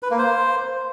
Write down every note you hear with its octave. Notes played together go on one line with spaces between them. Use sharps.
B4
A#3
C5